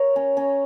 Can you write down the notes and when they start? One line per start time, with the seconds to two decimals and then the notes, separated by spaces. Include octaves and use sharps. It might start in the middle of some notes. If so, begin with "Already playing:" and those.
Already playing: A#4 C#5
0.16 C#4
0.37 C#4